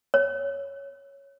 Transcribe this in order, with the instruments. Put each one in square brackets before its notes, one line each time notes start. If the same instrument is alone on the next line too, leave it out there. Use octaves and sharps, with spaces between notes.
[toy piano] C#5